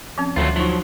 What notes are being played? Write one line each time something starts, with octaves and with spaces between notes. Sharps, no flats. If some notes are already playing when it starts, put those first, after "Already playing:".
F3 C4 C#4
D2 D#3 F#3 A3 F4
F3 F#3 D#4 C#6